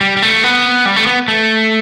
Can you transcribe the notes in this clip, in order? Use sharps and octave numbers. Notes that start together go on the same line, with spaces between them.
G3
G3
A3
B3
G3
A3
B3
A3